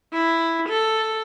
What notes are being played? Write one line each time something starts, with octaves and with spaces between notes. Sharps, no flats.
E4
A4